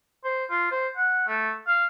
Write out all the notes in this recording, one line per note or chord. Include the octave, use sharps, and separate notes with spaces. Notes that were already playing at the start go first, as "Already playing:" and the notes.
C5
F4
C5
F#5
A3
F5